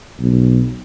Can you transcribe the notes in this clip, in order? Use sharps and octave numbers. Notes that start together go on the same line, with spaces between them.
B1